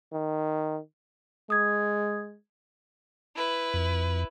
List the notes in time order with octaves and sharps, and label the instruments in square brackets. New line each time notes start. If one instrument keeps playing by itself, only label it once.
[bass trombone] D#3
[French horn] G#3 [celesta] D#6 G#6
[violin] E4 B4
[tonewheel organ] F2